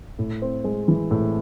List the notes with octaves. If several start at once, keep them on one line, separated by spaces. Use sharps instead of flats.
A2
C4
G#3
E3
A2